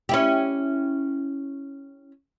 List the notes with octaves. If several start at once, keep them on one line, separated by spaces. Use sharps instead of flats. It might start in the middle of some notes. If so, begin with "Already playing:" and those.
C#4 E4 G4